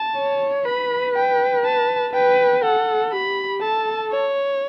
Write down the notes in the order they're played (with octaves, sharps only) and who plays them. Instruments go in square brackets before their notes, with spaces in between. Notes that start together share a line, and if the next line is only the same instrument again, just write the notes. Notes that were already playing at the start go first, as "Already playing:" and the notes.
Already playing: [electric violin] A5
[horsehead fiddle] C#5
[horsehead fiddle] B4 [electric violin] B5
[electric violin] G5
A5
[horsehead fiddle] B4 [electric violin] G5
[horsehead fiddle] A4 [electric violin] F#5
[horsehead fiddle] G4 [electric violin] B5
[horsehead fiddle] A4 [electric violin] A5
[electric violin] C#5